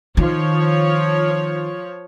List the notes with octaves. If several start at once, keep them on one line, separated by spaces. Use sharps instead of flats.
D#3 F3 C#5